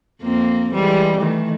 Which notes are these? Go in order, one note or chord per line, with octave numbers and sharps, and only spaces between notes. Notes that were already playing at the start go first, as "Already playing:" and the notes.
F2 A#3 C4
E3 G3 G#3
D#3 E3 A3